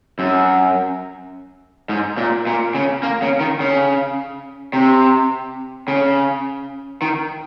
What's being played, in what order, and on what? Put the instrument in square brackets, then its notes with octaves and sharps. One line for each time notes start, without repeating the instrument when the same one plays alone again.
[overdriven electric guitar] F#2
G#2
A#2
A#2
C#3
A#3
C#3
D#3
C#3
C3
C#3
D#3